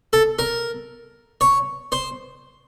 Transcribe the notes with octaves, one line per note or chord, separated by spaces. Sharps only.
A4
A#4
C#5
C5